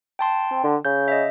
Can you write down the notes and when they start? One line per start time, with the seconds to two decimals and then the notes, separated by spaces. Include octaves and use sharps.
0.19 G5 A5 C6
0.51 C4
0.64 D3
0.85 C#3 G6
1.08 D#5 E5